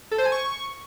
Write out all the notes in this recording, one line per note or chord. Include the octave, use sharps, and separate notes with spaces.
A4
C5
G#5
C#6